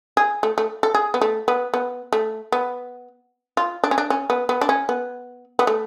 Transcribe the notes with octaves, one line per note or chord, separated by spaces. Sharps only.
G#4
A3
A3
A4
G#4
B3
A3
B3
B3
A3
B3
F4
D4
C#4
D4
C#4
B3
B3
D4
C#4
B3
B3
A3